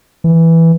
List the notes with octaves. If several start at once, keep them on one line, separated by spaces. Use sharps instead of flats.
E3